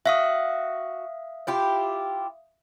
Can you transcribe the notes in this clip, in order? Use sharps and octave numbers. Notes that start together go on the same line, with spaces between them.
F#4 E5 F5 D#6
E4 F4 G4